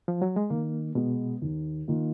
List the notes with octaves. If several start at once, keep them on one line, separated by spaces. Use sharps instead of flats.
F3
F#3
G#3
D#3 A#3
B2 G#3 B3
D#2
D#3 A#3 F4